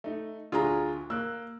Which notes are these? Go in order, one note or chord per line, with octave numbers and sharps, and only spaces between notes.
A3 D#4
D2 D4 F4 G#4 A#5
A#3 E6 F#6